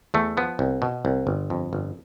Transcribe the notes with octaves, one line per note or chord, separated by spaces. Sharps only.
E2 A3
F3 B3
C2
B2
C2
G1
F2
G1